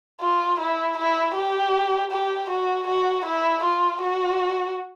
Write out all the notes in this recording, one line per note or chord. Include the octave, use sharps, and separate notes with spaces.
F4
E4
E4
G4
G4
F#4
F#4
E4
F4
F#4